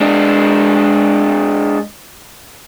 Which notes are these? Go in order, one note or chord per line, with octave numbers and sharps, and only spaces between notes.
G#3 D4